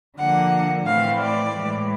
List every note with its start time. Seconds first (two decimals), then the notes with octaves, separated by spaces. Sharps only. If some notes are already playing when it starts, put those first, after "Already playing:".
0.18 D3 F3 A#3 F#5
0.86 A2 E3 A3 C4 F5
1.20 D5
1.54 A2 E3 G#3